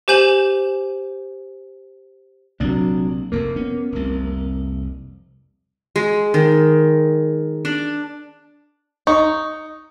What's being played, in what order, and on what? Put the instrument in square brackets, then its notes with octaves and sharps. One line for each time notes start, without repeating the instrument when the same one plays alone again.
[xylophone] G4 C5 G#5 G6 E7 F#7
[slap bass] A#1 C3 A#3 [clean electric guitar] F#3 D4
[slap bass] F1 F2 [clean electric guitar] A#3
[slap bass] B3 C#4
F1 C2
[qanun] G#3
D#3
D4
[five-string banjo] D#4 [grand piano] C#6